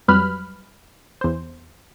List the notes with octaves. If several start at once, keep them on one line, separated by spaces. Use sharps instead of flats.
F2 F#3 G3 B4 B5 F6
E2 C5